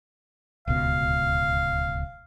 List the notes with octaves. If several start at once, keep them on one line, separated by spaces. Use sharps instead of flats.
D1 C#2 B2 F5